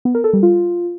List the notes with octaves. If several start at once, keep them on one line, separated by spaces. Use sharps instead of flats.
B3
A#4
A4
G3
F4